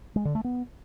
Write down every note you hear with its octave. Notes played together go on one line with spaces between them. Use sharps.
G#3
D3
A3
B3